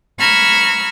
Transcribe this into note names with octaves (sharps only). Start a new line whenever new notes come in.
A#5 B5 C#6 E6 F6 G#6